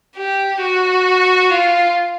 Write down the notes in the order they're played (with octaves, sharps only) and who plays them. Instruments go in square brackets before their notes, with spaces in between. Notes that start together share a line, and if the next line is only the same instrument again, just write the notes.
[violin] G4
F#4
F4